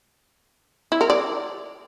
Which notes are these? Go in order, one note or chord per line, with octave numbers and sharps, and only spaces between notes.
E4
A#4
D5